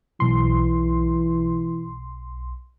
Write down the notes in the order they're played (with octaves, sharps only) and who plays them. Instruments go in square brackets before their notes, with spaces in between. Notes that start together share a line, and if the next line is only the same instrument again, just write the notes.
[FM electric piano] B1 C6 [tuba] E3